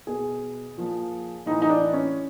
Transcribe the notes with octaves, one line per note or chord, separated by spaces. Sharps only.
B2 G#4
A#2 F3
A2 E3 D#4
D#4
D4
C#4